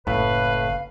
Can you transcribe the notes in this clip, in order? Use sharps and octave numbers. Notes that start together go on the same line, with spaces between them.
F#1 A2 B4 F5